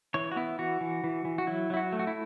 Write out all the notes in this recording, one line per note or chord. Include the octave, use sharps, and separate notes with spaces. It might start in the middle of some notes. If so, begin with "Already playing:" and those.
E3 C#5
F#4
B3 E4
E3 F#4
E3
E3
E3
F#4
F#3 E4
F#3 E4
F#4
A3
F#4
E4